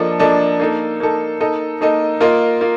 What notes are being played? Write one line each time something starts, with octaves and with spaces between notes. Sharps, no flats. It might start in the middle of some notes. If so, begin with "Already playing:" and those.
Already playing: F3 A#3 D4 A4 D#5
F3 A#3 D4 A4 D#5
A#3 D#4 A4
A#3 D#4 A4
A#3 D#4 A4 D#5
A#3 D#4 A4 D#5
A#3 F4 A#4 D#5
A#3 F4